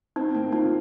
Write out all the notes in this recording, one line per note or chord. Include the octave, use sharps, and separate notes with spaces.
C4 D#4
A#3
D#4 F4